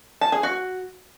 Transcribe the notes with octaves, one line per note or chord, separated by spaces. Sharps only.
A5
G#4
F#4